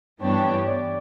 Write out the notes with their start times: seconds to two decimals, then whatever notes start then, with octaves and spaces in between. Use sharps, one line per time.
0.21 G2 E3 B3 D4 G4 C#5
0.66 D5